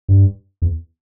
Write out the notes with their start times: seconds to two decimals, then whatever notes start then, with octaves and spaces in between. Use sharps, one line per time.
0.09 G2
0.62 E2